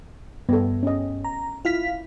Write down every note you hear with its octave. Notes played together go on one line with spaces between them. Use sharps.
G2 B3 A4
C#4 D#5
A#5
E4 F4 F5 B6